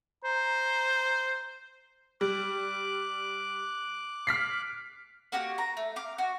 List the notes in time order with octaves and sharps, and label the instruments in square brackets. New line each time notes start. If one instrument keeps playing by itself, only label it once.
[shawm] C5 [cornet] A#5
[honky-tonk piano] G3 [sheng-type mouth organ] D6 F#6
[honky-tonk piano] F6 B6 C7
[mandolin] A#3 F#4 G4 F#5
A#5
A3
F5 D6
F#4